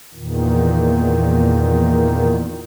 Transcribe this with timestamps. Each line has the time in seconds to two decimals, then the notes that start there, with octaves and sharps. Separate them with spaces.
0.14 E2 A#2 D#3